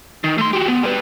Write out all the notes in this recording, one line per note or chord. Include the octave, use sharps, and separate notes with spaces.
D#3
A3 C6
F#4 G4
B3
G3 B4